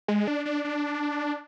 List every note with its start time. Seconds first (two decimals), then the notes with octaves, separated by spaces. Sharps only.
0.08 G#3
0.27 D4
0.45 D4
0.64 D4